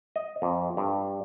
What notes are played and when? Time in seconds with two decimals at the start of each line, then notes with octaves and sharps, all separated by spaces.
0.16 D#5
0.42 F2
0.77 G2